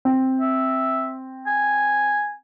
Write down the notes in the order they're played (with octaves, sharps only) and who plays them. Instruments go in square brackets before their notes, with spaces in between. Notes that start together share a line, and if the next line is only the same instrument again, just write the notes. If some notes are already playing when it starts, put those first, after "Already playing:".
[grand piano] C4
[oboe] E5
G#5